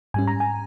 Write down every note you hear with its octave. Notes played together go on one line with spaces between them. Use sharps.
G#2 G3 C#4 G#5
A#5
G#5